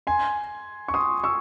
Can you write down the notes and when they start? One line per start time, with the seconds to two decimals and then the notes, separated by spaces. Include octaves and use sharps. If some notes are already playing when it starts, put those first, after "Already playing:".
0.07 G#5 C6
0.88 C#6
0.94 C6 D#6
1.24 C#6 E6